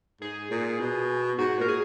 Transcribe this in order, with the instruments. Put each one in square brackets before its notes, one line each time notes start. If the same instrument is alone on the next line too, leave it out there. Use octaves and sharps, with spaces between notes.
[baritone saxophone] G#2 [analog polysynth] G#4
[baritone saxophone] A#2
B2
[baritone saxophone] G#2 [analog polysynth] F#4
[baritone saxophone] A#2 [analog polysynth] A#4
[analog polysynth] G#4